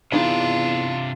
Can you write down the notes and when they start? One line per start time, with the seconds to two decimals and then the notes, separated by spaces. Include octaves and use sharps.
0.12 E2 C3 D4 D#4 F4 G#4 B5